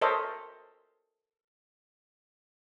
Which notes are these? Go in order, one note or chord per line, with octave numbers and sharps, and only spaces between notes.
A4 A#4 C5 C#5 D#5 E5